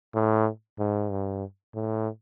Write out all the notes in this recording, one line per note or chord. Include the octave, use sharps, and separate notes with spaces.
A2
G#2
G2
A2